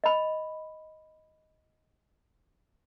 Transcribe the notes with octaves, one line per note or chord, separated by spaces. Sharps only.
D#5 B5